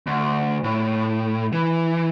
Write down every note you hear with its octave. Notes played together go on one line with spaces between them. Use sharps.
D2
A2
E3